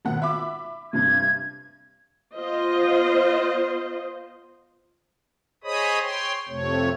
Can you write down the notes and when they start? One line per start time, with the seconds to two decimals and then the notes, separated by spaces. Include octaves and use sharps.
0.05 G#1 B2 F#5
0.22 E5 B5 D6
0.93 G2 C3 G#6
2.37 B3 F4 C5 D#5
5.64 G#4 C5 C#5 D#5 B5 D#6
6.01 C#5 G5 C6
6.48 F2 C3 A3 C#5